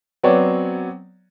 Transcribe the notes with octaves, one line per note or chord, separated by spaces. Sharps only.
F#3 B3 C4 C#5 D5 F#5